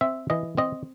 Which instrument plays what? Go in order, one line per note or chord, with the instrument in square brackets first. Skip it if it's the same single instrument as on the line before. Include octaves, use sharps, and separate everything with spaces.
[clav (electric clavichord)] C4 E5
E3 D#5
C4 D#5